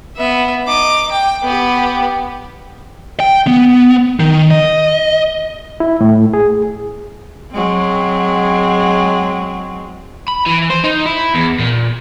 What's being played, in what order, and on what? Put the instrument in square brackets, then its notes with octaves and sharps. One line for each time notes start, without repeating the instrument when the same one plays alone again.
[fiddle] B3 E5
D#4 D6
G5
B3 G4
[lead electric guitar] G5
B3
D#3
D#5
[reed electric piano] E4
A2
G#4
[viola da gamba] F#3 G#3 C4
[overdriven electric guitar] B5
E3
C5
D#4
E4
E2
A#2